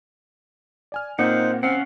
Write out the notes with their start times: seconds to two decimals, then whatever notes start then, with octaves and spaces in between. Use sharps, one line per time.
0.92 D5 G#5 F6
1.19 A#2 A#3 C4 D#4 C5 F#5
1.63 C4 C#4 F5 F#5